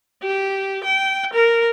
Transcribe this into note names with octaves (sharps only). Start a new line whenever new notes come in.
G4
G5
A#4